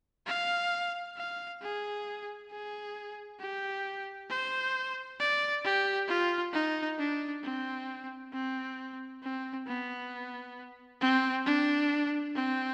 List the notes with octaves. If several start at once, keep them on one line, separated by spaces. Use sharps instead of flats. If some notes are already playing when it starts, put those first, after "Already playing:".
F5
F5
G#4
G#4
G4
C5
D5
G4
F4
D#4
D4
C4
C4
C4
B3
C4
D4
C4